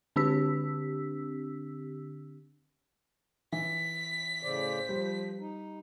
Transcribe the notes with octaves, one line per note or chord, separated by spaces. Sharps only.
D3 C4 D4 G4 E6 B6
E3 B6
A2 C#3 C5 D5
F3 G3
D#4